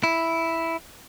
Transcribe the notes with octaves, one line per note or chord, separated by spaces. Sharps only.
E4